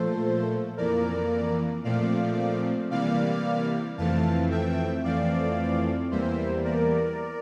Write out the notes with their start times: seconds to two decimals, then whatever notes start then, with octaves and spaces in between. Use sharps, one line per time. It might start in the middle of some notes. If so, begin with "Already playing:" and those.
Already playing: A#2 F3 A3 A4 C5
0.77 F2 E3 A#3 A#4 D5
1.84 A#2 F3 A3 C4 D5 F5
2.91 C3 E3 G3 A#3 D5 F5
3.97 F2 E3 A3 C4 F5 A5
4.51 E5 G5
5.04 F2 E3 A3 C4 D5 F5
6.11 E2 E3 G3 A#3 C5 E5
6.65 A#4 D5